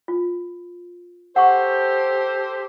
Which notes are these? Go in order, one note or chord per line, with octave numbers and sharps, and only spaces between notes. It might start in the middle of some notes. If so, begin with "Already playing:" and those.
F4
G4 A4 C5 F#5 C#6